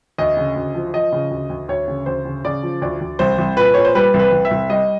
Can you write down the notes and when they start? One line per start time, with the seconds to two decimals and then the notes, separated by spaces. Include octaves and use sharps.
0.18 D2 D#5
0.37 C#3
0.56 D2
0.74 F3
0.94 F3 D#5
1.12 C#3
1.31 D2
1.50 D2
1.69 D2 C#5
1.88 C#3
2.06 D2 C5
2.25 C#3
2.44 C#3 D5
2.63 F3
2.82 D2 D5
3.01 D2
3.19 C2 C5
3.38 C2
3.57 A#2 B4
3.74 A#2 C#5
3.85 C5
3.95 G3 B4
4.14 C2
4.19 B4
4.32 C2
4.45 E5
4.51 C2
4.70 G3 D#5